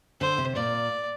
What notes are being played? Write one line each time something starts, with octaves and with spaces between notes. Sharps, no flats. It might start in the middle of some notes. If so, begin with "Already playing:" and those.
D3 C5
C3
A#2 D5